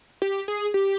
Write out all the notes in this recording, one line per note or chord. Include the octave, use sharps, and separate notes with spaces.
G4
G#4
G4